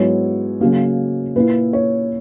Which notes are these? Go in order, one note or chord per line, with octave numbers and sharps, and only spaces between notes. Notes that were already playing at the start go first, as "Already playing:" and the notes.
Already playing: G#2 F#3 B3 E4 C#5
C#3 F#3 A#3
A#2 A#3 E4 B4
C#5